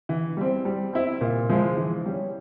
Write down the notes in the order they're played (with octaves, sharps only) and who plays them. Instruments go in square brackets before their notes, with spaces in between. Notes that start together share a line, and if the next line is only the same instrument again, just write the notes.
[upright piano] E3
G3 C4
G3
C4 E4
A#2
F3 G#3 E4
E3
G3 C#4